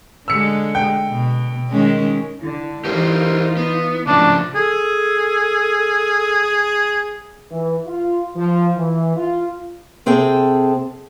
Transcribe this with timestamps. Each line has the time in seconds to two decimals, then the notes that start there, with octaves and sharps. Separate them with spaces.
0.28 D3 G#3 E6 C#7
0.75 G5
1.09 B2
1.69 D#3 G#3 C#4
2.41 D3 E4
2.85 E3 D#4 F4 G4 A#4 C5
3.57 B3
4.07 A2 C#3 F3 D4 F#4
4.55 G#4 A4
7.51 E3
7.87 F4
8.35 F3
8.76 E3
9.16 F4
10.06 C3 C4 G#4 A4 G5